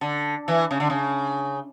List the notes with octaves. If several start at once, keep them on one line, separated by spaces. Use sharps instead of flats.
D3
E3
C#3
D3
C#3